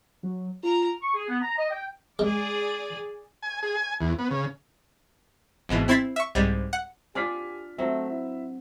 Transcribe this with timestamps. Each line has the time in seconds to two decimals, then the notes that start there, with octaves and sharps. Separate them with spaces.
0.23 F#3
0.63 F4 A#4 A#5
1.02 C#6
1.15 G#4
1.28 B3
1.42 A#5
1.57 D#5
1.70 G5
2.19 G#3 G#4 D5
3.42 G#5
3.63 G#4
3.76 G#5
4.01 E2
4.19 B3
4.31 C#3
5.69 G#1 G#2 B2 E3
5.88 C4 E4 C6 G#6 A6 B6
6.16 E5 C#6
6.35 C2 G#2 G3
6.73 F#5
7.15 D4 F4 G4 D5 G#5 F6 B6
7.78 F#3 A3 C4 E5
8.11 E4